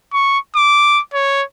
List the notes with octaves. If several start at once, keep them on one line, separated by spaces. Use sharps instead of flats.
C#6
D6
C#5